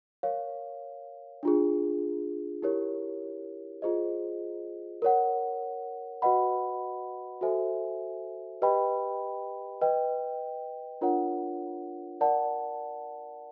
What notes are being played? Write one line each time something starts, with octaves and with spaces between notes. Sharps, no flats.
A#4 C#5 F5
D4 F4 G#4
E4 G4 A#4 C#5
F4 G#4 C5 D#5
A#4 C#5 F#5
F#4 B4 D#5 F#5 B5
F#4 A4 C5 E5 G#5
G4 B4 D#5 G5 B5
B4 D#5 G5
D4 F4 A#4 C#5 F#5
A#4 D5 F#5 A5